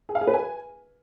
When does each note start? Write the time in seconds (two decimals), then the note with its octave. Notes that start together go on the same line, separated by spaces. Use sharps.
0.09 G#4
0.15 F5
0.21 G#4
0.27 B4
0.34 G#5